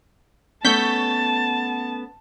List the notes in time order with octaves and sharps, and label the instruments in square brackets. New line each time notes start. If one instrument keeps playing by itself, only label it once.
[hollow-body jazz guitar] A3 B3 C#4 [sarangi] A5 [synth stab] C#6 G6 B6